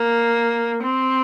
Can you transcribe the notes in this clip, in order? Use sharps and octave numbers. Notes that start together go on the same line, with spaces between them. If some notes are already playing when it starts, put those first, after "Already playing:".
Already playing: A#3
C4